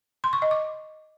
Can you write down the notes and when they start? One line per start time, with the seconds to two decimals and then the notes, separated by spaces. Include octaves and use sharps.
0.24 C6
0.33 C#6
0.42 D#5
0.51 D6